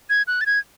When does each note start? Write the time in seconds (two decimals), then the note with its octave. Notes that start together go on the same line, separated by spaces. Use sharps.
0.10 G#6
0.27 F#6
0.41 A6
0.46 G#6